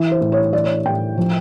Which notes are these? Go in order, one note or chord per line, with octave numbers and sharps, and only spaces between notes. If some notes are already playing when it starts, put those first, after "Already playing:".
Already playing: E3
C5
A2
C#5
E3 D5
C#5
D5
A2 G5
F3